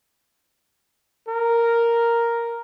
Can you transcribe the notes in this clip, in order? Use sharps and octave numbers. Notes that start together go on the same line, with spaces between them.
A#4